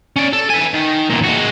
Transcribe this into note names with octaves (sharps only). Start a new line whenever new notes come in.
C#4 D5
A4
B4 G#5
D#3
E2 A#2
G#3 F#4